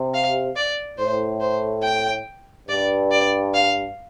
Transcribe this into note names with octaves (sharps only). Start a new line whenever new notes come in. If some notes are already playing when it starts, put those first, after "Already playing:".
Already playing: C3
F5
D5
A2 C5
C5
G5
G2 D5
D5
F5